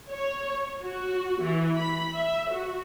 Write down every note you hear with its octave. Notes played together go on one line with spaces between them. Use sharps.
C#5
F#4
E3
B5
E5
F#4